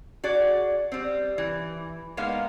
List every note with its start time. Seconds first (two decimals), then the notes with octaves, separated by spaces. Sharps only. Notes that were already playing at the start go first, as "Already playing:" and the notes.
0.24 F#4 G#4 D5
0.92 G3 C4
1.38 E3
2.17 G#3 A#3 B3 D#4 F5